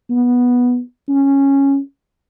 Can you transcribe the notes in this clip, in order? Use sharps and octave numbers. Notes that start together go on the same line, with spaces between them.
B3
C#4